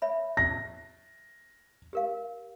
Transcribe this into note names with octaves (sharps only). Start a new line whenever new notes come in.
C#5 E5 B5
C#6 A#6
G4 A#4 F5